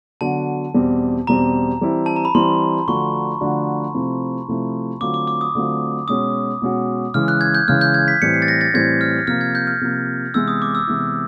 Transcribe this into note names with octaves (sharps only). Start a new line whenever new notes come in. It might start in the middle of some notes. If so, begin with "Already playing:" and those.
D3 F#3 B3 D4 F#4 A5
E2 B2 G3 C4
E2 B2 G3 C4 A#5
E3 G3 C4 E4
A5
A#5
B5
E3 G3 C4 E4 C6
D3 F3 A3 D4 F#4 C#6
D3 F3 A3 D4 F#4
C3 F3 A3 C4 E4
C3 F3 A3 C4 E4
D3 F#3 A3 C4 F4 D6
D6
D6
D#6
D3 F#3 A3 C4 F4
B2 G#3 C#4 F#4 D#6
B2 G#3 C#4 F#4
C#3 E3 G#3 F6
F#6
G#6
G6
C#3 E3 G#3 F6
G6
G#6
B6
A2 E3 G3 C4 C#7
C7
A6
A#6
A6
A2 E3 G3 C4 G#6
F6
C3 F3 A#3 F6
G#6
G6
F6
C3 F3 A#3
C3 E3 G#3 B3 E4 E6
D#6
D6
E6
C3 E3 G#3 B3 E4